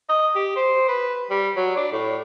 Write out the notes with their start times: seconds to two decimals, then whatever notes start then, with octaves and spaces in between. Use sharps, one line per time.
0.09 D#5
0.35 G4
0.56 C5
0.88 B4
1.30 G3
1.56 F#3
1.76 D4
1.92 A2